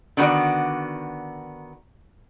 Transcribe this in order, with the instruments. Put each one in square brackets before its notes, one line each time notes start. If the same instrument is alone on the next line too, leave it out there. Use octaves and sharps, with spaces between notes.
[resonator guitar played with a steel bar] D3 D#3 B3 F#4 D5